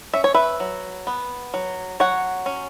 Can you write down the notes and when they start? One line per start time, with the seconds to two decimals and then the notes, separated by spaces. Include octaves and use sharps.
0.14 C#4 E5
0.24 C#5
0.34 B4 E5
0.60 F#3
1.07 B3
1.54 F#3
2.00 F#3 C#5 F#5
2.46 C#4